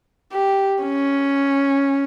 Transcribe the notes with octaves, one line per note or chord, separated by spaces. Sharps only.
G4
C#4